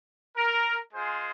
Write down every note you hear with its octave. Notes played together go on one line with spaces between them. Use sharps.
A#4
G#3 F4 G#4 C5